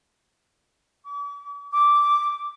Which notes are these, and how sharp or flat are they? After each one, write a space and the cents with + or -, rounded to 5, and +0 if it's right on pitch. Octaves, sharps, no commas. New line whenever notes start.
D6 -45
D6 -5